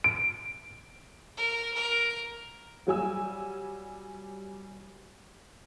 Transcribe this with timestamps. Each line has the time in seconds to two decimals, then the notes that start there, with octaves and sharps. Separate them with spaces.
0.04 D7
1.37 A#4
1.74 A#4
2.87 F#3 G3 G#5 E6